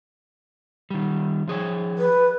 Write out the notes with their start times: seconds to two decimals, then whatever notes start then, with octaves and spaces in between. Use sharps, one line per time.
0.91 D#3 G3
1.48 F3 G#4 C#5
1.98 B4